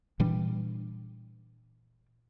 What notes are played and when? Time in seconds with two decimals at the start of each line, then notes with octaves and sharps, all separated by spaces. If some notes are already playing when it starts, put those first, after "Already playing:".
0.20 A#2 E3 G3 D4